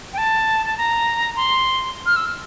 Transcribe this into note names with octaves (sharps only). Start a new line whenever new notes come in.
G5
A5
A5
A#5
C6
F6
E6